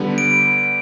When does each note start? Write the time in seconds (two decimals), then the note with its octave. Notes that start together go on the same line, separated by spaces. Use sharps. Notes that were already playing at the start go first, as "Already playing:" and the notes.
Already playing: D3 G3 B3
0.18 D7